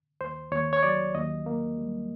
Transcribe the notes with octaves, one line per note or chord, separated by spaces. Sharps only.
D#2 C5
D#2 C#5
C#5
F#3 D5
D#2 D#5
A#3
G3